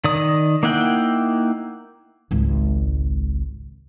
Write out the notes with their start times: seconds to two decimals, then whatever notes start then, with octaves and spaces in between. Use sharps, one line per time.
0.04 D#3 D5 D#6
0.63 A#3 D#4 E4 F#5 G5
2.31 G#1 C#2